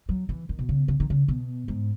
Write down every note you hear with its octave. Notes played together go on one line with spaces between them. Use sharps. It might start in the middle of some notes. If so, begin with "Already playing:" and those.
F#3
E3
D#3
B2
C#3
C#3
D#3
C#3
B2
G#2